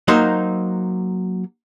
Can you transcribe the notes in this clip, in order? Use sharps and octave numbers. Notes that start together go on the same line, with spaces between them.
F#3 A#3 D#4 C5